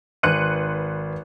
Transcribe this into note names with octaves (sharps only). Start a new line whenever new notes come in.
G#1 B4 C6 F#6 C#7 D#7